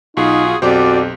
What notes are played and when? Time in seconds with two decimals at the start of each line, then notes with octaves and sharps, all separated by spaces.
0.17 B1 D#4 F4 F#4 G#4
0.62 B1 F2 F#4 G4 C5 D5